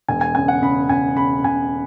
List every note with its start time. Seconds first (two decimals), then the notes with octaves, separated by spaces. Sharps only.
0.08 E1 G#5
0.21 G#5
0.35 C#3 G#5
0.48 F#5
0.62 C#3 B5
0.89 C#3 G#5
1.17 C#3 B5
1.44 C#3 G#5